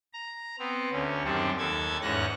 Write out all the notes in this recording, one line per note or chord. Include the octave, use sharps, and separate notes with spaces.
A#5
B3 C4
D2 C#4
F#2 D#3 G3 C4 D4
D#2 A4 A5 G#6
E2 G#2 C#4 F#6 A#6